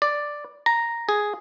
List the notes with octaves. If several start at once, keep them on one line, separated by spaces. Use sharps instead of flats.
D5
A#5
G#4